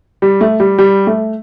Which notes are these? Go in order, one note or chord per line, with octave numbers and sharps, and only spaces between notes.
G3
A3
G3
G3
A3